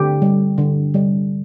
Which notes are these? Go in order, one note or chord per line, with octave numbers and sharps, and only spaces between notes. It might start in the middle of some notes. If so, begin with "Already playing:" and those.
Already playing: D3 G4
G3
D3
G3